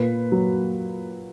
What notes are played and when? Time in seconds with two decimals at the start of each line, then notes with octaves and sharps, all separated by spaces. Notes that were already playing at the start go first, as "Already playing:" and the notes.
Already playing: A#2 B4
0.32 F#3